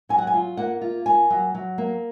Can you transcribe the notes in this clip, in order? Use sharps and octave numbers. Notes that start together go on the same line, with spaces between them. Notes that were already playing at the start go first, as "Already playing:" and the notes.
F#3 G#5
F#5
G#5
F4
A#3 F#5
F4
A#3 G#5
F#3
F#3
A#3